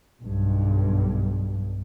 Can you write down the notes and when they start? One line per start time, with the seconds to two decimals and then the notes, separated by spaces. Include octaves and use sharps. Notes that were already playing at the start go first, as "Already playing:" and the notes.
0.22 B1 G2